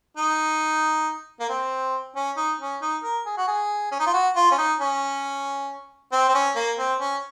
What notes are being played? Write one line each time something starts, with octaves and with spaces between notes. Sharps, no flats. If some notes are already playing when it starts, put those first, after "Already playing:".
D#4
A#3
C4
C#4
D#4
C#4
D#4
A#4
G#4
F#4
G#4
C#4
D#4
F4
F#4
F4
C#4
D#4
C#4
C4
C4
C#4
A#3
C4
C#4